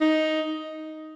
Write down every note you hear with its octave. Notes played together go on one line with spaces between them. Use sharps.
D#4